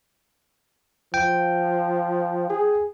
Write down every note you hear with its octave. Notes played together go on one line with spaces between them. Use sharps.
F3 G5
G#4